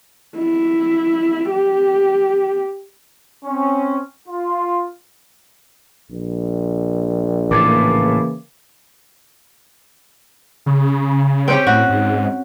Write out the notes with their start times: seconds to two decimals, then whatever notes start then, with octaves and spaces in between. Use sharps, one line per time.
0.38 E4
1.51 G4
3.44 C4 C#4
4.28 F4
6.11 A#1
7.51 A2 C#3 E3 A#3 D6 G#6 A6
10.66 C#3
11.48 C4 C#4 G4
11.67 A2 F#4
11.90 G#2